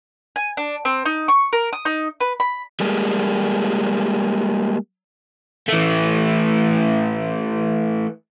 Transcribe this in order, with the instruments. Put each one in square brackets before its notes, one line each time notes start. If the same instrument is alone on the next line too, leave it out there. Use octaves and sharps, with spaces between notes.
[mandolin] G#5
D4
C4
D#4
C#6
A#4
D#6
D#4
B4
B5
[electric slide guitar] G3 G#3 A#3
[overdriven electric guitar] E3 A3